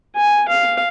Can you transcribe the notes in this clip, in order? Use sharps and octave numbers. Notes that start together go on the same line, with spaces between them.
G#5
F5